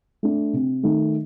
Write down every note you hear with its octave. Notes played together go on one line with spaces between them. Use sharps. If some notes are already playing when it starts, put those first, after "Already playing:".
A3 D4
C3
D#3 A3 D#4